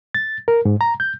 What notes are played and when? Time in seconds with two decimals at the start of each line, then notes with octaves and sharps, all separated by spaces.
0.15 A6
0.48 A#4
0.65 G#2
0.81 A#5
1.00 G6